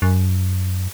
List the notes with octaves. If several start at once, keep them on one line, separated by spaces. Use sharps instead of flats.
F#2